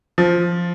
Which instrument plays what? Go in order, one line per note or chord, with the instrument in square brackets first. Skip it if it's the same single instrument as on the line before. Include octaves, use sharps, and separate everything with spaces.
[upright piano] F3